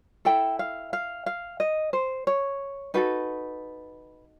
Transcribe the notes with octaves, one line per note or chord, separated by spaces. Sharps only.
E4 A4 G5
F5
F5
F5
D#5
C5
C#5
D#4 F#4 A4 B4